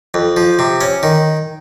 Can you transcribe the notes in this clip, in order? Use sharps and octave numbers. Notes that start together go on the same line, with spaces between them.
F2
F3
C3
C#4
D#3